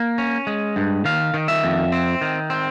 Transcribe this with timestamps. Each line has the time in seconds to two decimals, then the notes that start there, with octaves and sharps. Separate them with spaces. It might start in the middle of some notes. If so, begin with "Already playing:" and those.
Already playing: A#3
0.18 C#4
0.47 G#3
0.76 G2
1.05 D#3 F5
1.34 D#3
1.48 E5
1.64 F2
1.92 C4
2.21 D#3
2.50 C4